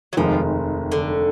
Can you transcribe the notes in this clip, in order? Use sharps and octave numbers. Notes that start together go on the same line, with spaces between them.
F#3
F1 D#2 D#3 F3 G#3
D3